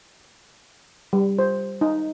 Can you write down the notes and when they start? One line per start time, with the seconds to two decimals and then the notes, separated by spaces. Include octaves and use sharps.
1.13 G3
1.39 C5
1.81 D#4